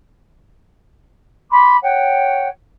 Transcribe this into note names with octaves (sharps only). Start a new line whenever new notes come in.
B5 C6 D6
C#5 F#5 G5